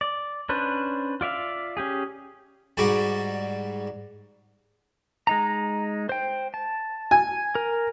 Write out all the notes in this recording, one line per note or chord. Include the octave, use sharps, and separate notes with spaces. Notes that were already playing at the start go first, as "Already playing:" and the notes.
D5
C#4 D4 B4 C5
F4 D5 E5 F5
C#4 G4 G#4
G#2 G3 F#4 D5
G#3 D#4 A#5
C5 G5
A5
G#5
A#4